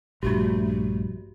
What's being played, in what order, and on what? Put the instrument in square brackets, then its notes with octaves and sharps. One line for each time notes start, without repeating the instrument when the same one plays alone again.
[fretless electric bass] A#1 G2 [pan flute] A3 [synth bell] F#4 G4